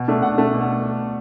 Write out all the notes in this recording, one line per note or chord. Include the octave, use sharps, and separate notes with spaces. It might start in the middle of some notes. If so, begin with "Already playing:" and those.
Already playing: B2
A3 D4
B2 F#5
A3 D4
B2